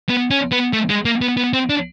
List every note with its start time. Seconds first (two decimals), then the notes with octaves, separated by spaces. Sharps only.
0.09 B3
0.31 C#4
0.52 B3
0.73 A3
0.90 G#3
1.05 A#3
1.21 B3
1.37 B3
1.53 C4
1.69 D4